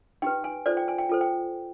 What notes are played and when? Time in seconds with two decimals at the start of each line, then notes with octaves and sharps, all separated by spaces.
0.22 D#4 G4 B4 G5
0.44 G#5
0.66 F4 A4 C5 D5
0.77 G5
0.88 G#5
0.98 G5
1.09 F4 A4 C5
1.21 G5